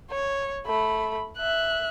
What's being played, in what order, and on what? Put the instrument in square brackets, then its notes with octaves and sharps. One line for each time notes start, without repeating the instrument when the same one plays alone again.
[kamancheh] C#5
A3 B5
E5 F#6